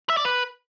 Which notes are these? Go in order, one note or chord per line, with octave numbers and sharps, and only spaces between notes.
E5
D5
B4